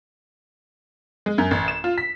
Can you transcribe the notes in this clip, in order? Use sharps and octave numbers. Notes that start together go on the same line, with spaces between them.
G#3
F#2
A1
E7
F4
B6